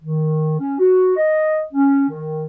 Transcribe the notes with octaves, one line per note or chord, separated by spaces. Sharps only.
D#3
C#4
F#4
D#5
C#4
D#3